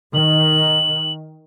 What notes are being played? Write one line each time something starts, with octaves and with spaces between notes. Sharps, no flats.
D#3 F#7